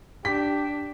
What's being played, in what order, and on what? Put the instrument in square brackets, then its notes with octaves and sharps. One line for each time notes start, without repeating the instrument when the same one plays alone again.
[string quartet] D4 [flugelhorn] G4 [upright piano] B6